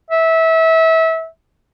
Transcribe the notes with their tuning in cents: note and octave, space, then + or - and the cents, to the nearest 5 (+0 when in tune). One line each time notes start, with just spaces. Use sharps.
E5 -25